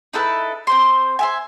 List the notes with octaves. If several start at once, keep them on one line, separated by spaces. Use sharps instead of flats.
D#4 E4 A4 B4
C4 C5 C6
C5 E5 G#5